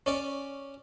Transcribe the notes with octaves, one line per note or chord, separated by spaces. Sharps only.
C#4 D5